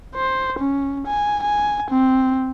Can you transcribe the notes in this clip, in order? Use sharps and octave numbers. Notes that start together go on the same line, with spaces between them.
C5
C#4
G#5
G#5
C4